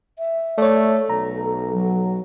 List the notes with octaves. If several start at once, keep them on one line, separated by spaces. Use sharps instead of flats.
E5
A3 C#5 D5
B1 A4 A#5
F#3